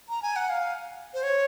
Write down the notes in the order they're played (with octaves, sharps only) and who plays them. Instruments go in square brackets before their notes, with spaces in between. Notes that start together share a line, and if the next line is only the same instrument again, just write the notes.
[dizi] A#5
G#5
F#5
F5
C5
C#5